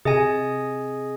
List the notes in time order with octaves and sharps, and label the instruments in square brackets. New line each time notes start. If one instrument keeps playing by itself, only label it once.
[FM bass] C3 [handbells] G#4 D#5 G#5